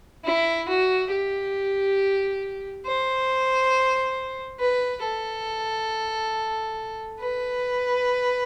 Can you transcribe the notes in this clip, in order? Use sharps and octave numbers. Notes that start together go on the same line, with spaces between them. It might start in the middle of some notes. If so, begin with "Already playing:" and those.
E4
F#4
G4
C5
B4
A4
B4